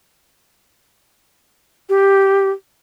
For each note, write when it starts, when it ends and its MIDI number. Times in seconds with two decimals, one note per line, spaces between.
1.89 2.49 67